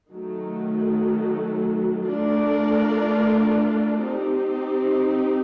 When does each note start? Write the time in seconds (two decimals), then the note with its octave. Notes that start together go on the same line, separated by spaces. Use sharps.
0.10 D#3 F#3 A3
2.05 A3 D4 F4 A#4 D5
4.01 C4 D#4 G4